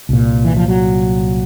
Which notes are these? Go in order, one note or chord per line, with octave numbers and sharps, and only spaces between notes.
C2 A#2
E3
F3
F#3